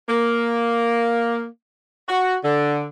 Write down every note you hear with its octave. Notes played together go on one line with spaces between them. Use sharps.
A#3
F#4
D3